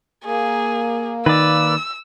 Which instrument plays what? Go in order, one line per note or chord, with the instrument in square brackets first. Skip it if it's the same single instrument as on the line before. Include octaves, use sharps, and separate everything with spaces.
[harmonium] A#3 [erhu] G#4
[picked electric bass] D#3 [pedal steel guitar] B4 D5 [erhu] E6